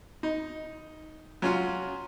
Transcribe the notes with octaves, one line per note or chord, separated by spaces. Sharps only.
D#4
F#3 C#4 F4